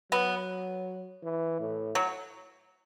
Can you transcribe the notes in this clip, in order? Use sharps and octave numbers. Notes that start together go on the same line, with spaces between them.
F#3 B3
E3
A2
F#3